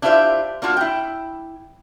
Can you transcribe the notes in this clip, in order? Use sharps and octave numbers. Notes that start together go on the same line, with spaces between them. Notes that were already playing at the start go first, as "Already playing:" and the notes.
D4 E4 F4 G4 C5 E5
A#3 D4 F4 F#4
E4 G5